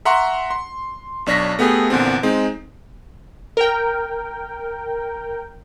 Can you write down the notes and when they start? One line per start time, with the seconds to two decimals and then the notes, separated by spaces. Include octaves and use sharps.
0.05 E5 F#5 A#5 C6 C#6
0.50 C6
1.26 B1 D4 C#5 A#6 B6
1.59 A3 B3 G4 G#4
1.90 E2 A#2 D3 C4
2.23 G#3 C4 D#4
3.57 A#4 G5